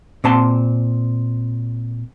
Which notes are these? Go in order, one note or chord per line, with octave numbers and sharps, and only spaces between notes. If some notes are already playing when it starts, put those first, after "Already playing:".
A#2 C4 A5 C6